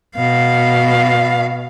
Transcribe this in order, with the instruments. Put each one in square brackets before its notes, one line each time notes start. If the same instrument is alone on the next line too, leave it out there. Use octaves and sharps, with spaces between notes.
[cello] B2 F5